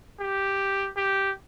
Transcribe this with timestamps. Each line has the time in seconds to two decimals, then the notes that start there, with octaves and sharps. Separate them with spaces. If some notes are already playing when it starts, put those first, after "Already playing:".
0.20 G4
0.97 G4